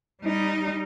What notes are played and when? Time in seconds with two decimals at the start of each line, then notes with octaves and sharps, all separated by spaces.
0.23 G3 D#4